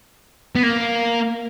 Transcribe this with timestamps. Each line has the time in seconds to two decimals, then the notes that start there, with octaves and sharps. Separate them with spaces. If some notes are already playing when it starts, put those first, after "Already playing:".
0.56 B3
0.63 A#3